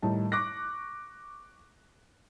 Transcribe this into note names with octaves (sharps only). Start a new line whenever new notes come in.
A2 D#3 G3 D#4 A5
C#6 D6 F#6 A#6